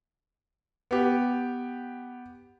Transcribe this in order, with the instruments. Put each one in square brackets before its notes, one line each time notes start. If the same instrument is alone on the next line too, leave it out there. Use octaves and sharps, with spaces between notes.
[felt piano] B3 G4